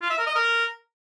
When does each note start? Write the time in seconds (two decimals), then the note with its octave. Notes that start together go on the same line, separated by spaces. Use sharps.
0.02 F4
0.10 E5
0.19 A#4
0.27 D#5
0.35 A#4